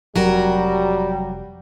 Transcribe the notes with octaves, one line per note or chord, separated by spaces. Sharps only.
F1 F#3 G3 F#4 A#4